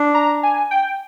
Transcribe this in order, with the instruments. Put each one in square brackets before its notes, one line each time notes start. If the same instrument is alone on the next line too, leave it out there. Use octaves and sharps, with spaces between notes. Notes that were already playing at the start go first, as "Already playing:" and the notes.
Already playing: [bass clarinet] D4
[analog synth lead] A#5
G#5
G5